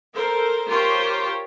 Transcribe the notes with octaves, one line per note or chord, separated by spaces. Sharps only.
A4 A#4 C5
F4 G4 A#4 C5 C#5 G5